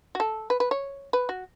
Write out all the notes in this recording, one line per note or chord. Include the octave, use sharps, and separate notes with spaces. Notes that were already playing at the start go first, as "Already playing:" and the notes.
F#4
A4
B4
B4
C#5
B4
F#4